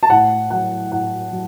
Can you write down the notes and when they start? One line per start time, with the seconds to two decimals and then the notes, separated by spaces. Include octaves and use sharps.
0.03 A5
0.10 A2 F#5
0.50 F#3 F#5
0.91 A2 F#5
1.32 F#3